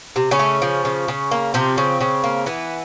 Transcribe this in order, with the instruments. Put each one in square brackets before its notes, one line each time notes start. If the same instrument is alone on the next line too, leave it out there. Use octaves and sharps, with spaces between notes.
[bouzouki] C3
C#3 C#4
A3
F3
C#3
C#3
A#3
C3 F3 C4
C#3
C#3
A#3
E3 B3